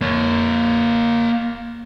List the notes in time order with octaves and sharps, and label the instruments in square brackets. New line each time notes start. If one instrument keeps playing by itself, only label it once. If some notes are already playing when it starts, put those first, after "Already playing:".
[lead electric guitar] A#3 C#5